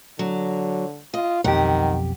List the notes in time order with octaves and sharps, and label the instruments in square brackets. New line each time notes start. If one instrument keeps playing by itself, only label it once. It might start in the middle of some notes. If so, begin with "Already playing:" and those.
[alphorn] D3 [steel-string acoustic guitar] F#3
[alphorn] F4 [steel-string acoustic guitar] D#5
[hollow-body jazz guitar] B1 F2 G4 [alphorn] D#3 [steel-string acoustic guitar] F#5